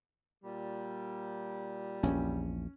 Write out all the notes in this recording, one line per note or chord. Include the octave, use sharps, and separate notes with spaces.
A#2 G3
A#1 E2 C#4